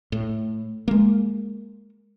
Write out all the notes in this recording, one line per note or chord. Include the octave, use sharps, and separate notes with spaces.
A2
G#3 A#3